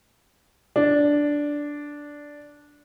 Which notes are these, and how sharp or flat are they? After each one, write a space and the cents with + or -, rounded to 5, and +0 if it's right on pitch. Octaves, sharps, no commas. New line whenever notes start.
D4 -5